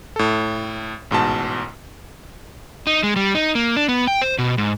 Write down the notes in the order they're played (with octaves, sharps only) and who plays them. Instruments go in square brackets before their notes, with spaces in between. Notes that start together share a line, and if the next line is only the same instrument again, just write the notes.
[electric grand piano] A2 A4
A1 G#2 B2 A5
[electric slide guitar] D#4
G#3
G3
D#4
A#3
D4
B3
G5
C5
B2
G#2